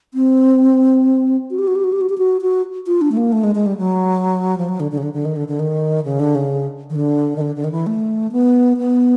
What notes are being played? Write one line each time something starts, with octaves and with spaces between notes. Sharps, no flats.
C4
F#4
G4
F#4
G4
F#4
G4
F#4
G4
F#4
F#4
F4
D4
A3
A#3
A3
G#3
G#3
G3
F#3
F3
F#3
D3
D3
C#3
D3
D3
D#3
D3
D3
D#3
C#3
D3
C#3
D#3
D3
D#3
D3
D3
D#3
E3
A3
B3
B3